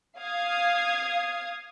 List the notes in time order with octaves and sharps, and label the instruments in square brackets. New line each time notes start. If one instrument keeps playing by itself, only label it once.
[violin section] F5 D#6 G#6